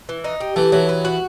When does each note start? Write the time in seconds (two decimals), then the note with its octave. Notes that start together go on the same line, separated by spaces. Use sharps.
0.09 E3
0.24 D#4
0.40 G4
0.56 E3 A3
0.72 E3 F#3
0.89 B3
1.05 F#4